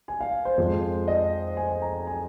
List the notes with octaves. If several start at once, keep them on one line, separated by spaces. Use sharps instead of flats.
G#5
F5
C5
F2 F3 G#3
D#5
G#5
A#5
G#5